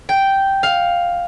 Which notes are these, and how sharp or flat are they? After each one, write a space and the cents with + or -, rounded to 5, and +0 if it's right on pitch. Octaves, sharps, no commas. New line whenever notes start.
G5 -5
F5 +5